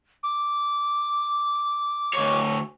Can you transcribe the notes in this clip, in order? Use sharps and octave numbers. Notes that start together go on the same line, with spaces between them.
D6
D2 C#5